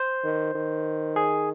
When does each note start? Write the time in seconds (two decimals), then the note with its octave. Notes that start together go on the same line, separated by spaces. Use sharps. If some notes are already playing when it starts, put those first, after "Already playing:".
Already playing: C5
0.24 D#3
0.55 D#3
1.16 G#4